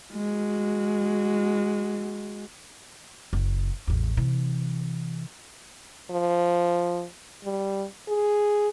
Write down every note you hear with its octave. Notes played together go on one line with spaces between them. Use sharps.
G#3 F#4
F#1
A1 E2
C3 E3
F3
G3
G#4